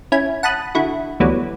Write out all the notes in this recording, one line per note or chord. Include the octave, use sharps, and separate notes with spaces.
C#4 E4 G#5
F#5 A5 B5 D#6 F#6
D3 E4 F#4
D2 E3 F#3 G3 B3